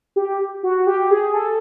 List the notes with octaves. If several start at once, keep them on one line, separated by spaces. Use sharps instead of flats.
G4
F#4
G4
G#4
A4